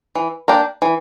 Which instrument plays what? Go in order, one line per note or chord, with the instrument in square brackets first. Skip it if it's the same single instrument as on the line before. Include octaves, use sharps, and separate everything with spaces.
[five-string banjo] E3
A#3 D4 G4 A#4
E3